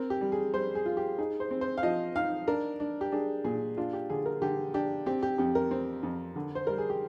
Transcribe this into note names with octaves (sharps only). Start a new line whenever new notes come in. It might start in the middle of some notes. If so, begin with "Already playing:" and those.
Already playing: C4 A#4
G4
G3
G#4
G3 C5
G#4
F4
G4
D#4 G#4
C5
C4
C5
F5
F3 D#5
D#4 F5
D4 A#4
D4
G4
D4 G#4
A#2 G#4
D4 F4
G4
D3 G#4
A#4
D3 G4
D4 G4
C4 G4
G4
F2 G4
A#4
C4
F2
D3
C5
G3 A#4
G#4
G4